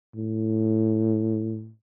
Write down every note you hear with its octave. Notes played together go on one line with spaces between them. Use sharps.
A2